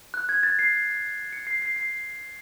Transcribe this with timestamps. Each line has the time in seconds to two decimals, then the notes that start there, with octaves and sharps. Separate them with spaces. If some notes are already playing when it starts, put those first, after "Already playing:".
0.14 F#6
0.29 G#6
0.43 A6
0.59 C7
1.33 C#7
1.47 C7
1.62 C7
1.76 C7